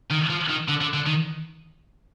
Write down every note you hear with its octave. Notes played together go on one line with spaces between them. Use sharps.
D#3
F3
D#3
D3
D3
D3
D#3